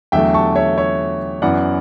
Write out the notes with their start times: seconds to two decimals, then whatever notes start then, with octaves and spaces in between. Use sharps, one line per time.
0.12 E2 D3 F#3 A3 E5 G5
0.34 A5 C#6
0.56 C#5 E5
0.78 C#5 E5
1.42 F#2 E3 B3 D5 F#5